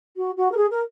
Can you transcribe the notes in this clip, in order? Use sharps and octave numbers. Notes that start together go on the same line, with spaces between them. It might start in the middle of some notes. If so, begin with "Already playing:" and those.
F#4
F#4
A#4
G#4
A#4